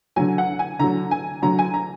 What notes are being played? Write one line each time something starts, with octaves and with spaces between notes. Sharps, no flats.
D3 F#3 G#5
F#5
G#5
D3 F#3 A#5
G#5
D3 F#3 A#5
G#5
A#5